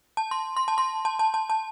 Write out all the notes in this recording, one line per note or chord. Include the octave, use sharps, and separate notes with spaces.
A5
C6
C6
A5
C6
A5
A5
A5
A5